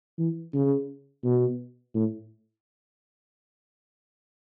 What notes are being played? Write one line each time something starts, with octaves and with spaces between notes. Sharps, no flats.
E3
C#3
B2
A2